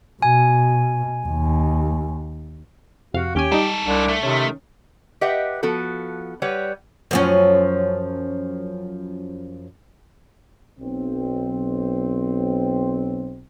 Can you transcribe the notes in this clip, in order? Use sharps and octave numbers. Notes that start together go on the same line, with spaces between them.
B2 G#5
D#2
F2 C3 F#4 F5
D#2 C#4 G4 G#5
G3 G#3 D#4 A4
C2 D4
A3
C3 D#3 C#4
G4 B4 D#5 E5 F#5 G5
F3 B3 F#4 A4
G3 B4 C#5 F#5
F#2 F3 C#4
B1 C4